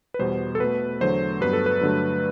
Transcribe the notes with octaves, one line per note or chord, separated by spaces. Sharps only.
B4
E2 B2 G3 B3 C5
A4
B2 A3 B4
E2 D3 F#3 A3 C5
G2 F#3 B3 B4
A4
B4
G2 D3 F#3 A3